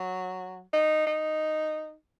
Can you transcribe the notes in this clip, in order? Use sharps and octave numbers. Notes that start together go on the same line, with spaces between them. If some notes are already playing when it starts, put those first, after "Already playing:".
Already playing: F#3
D#4
D#4